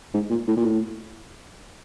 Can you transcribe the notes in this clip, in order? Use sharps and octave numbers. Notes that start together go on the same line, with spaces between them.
G#2
A#2
A2
A#2
A2